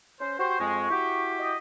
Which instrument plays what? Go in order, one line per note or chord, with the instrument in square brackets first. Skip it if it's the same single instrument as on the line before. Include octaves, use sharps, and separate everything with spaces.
[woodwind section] C#4 C5
[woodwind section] F#4 G4 C5 [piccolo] C#6
[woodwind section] F2 G#3
E4 F#4 G4
[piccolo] D#5